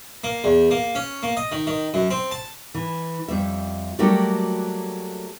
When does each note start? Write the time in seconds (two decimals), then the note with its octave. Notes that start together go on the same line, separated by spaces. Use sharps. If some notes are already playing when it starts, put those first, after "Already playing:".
0.24 A#3
0.44 E2
0.71 A#3
0.95 C#4
1.23 A#3
1.37 D#5
1.52 D#3
1.67 D#3
1.94 F#2
2.11 C4
2.31 A5
2.75 E3
3.28 F2 G3 E5
3.99 F#3 G3 A3 A#3 F#4 G4